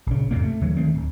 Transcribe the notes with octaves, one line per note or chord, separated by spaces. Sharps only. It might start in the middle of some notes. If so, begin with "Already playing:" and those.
A#1 C#3
E2 G#2 C3 A#3
A3
D#2 D3 E3 F#3
D2 D#3 A3 C4
D1